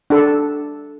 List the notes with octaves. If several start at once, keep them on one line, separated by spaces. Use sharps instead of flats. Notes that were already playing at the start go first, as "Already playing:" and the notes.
D4 A4